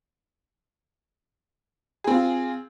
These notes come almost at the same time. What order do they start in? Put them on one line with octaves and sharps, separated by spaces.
G#4 C4 F4